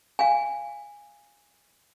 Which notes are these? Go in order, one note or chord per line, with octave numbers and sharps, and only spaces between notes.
F5 G#5